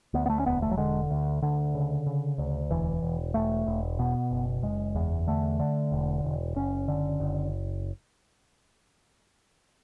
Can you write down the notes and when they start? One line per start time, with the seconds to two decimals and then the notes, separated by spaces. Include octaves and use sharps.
0.14 D2 B3
0.26 B3
0.30 A3
0.40 C#4
0.46 E1 B3
0.62 A3
0.71 F#3
0.77 D3 G#3
1.11 D2
1.42 D2 D3
1.75 C#3
2.06 C#3
2.38 D2
2.70 E1 E3
3.02 E1
3.34 E1 A3
3.66 E1
3.99 B2 B3
4.31 F#1
4.63 F#1 G#3
4.95 E2
5.27 D3 A3
5.60 D3
5.92 E1
6.24 E1
6.56 F#1 C#4
6.88 D3
7.20 F#1